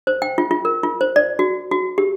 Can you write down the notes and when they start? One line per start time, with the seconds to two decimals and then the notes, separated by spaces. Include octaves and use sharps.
0.07 C5
0.22 G5
0.38 F4
0.51 F4
0.65 A#4
0.83 F4
1.01 C5
1.16 D5
1.39 F#4
1.71 F#4
1.98 G4